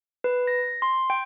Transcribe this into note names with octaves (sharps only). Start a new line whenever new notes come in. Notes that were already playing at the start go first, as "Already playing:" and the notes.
B4
A#6
C6
G5